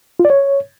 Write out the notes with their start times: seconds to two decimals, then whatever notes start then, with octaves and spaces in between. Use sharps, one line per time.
0.19 F4
0.25 D5
0.30 C#5